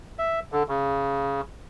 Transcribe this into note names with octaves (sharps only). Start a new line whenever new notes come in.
E5
D3
C#3